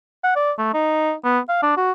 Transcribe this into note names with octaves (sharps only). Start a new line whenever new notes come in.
F#5
D5
A3
D#4
B3
F5
D4
F#4